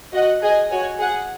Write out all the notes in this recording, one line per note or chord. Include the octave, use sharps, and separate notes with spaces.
F#4 D#5 F#5
G#4 D#5 G#5
F#4 C#5 G#5
G#4 F#5